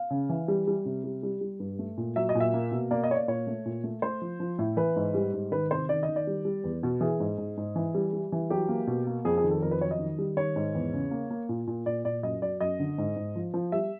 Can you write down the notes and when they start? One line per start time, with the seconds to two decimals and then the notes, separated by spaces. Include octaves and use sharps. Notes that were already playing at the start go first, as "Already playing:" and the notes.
Already playing: F5
0.10 C#3
0.29 E3
0.48 G3
0.67 G3
0.85 C3
1.04 G3
1.23 G3
1.41 G3
1.60 G2
1.79 A3
1.98 A#2
2.16 F#3 E5
2.29 D#5
2.35 A#2
2.40 E5
2.54 A#3
2.72 B2
2.91 A#3 D5
3.03 D#5
3.10 A#3 C#5
3.16 D5
3.28 A#2 C#5
3.47 A3
3.66 A#2
3.84 A3
4.02 A3 C5
4.22 F3
4.40 F3
4.59 A2
4.77 E3 B4
4.96 G#2
5.14 G3
5.33 G#2
5.52 D#3 B4
5.71 C3 C5
5.89 D#3 D5
6.03 D#5
6.08 D#3
6.16 D5
6.27 G3
6.45 G3
6.64 E2
6.83 B2
7.01 E3 G#4
7.20 G#2
7.38 G#2
7.57 G#2
7.76 E3
7.95 G3
8.13 G3
8.32 E3
8.50 F#3 G4
8.69 A#3
8.87 B2
9.07 A#3
9.25 F2 G#4
9.38 G#4
9.44 D#3
9.51 A4
9.62 F2 A#4
9.71 B4
9.81 F#3 C#5
9.91 D#5
9.99 D#3
10.19 G3
10.37 D#3 C#5
10.56 G#2
10.75 E2
10.93 C#3
11.11 A#3
11.30 A#3
11.49 A#2
11.67 A#2
11.86 A#2 D5
12.05 A#2 D5
12.23 F#2 D#5
12.42 F#3 D5
12.60 F#2 D#5
12.79 D3
12.98 G#2
13.16 G#2
13.36 F3
13.54 F3
13.72 G3 E5